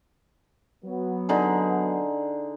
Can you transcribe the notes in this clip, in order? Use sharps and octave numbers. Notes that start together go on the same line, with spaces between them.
F#3 B3
D3 D#4 G#4